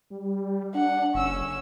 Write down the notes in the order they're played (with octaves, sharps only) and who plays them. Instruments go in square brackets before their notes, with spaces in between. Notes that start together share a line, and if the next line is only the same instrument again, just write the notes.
[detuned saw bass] G3
[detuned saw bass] D4 [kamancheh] F#5
[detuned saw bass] F#1 [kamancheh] C#4 E6